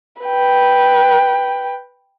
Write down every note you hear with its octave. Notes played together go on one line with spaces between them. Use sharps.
B4 G5